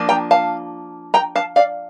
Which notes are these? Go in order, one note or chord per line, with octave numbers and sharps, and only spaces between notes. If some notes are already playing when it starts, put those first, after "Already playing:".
Already playing: F3 A#3 D4
G5 A#5
F5 A5
G5 A#5
F5 A5
D5 F5